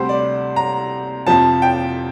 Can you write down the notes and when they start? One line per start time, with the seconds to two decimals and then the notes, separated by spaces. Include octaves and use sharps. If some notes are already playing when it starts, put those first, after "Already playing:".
Already playing: D2 C3 G3 C4 C5
0.09 D5
0.56 A#5
1.27 F2 C3 F3 A5
1.62 G5